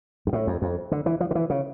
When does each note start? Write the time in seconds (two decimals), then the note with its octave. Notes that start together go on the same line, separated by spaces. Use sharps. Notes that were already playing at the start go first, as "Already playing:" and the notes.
0.27 G2
0.33 A2
0.47 F2
0.62 F2
0.91 D3
1.06 E3
1.20 F3
1.31 D3
1.35 E3
1.50 C#3